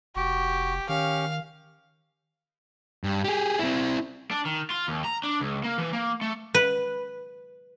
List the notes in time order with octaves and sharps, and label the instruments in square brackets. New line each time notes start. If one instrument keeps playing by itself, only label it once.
[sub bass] F1 [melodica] F#4 [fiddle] G4
[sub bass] D#3 [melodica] C#4 G4 [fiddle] F5
[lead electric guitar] G2
G4 G#4
C4 E4
[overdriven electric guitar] D4
D#3
F4
D#2
A#5
D4
C#2
A#3
E3
A#3
A3
[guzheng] B4